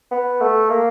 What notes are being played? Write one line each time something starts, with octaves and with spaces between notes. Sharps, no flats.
B3
A3
A#3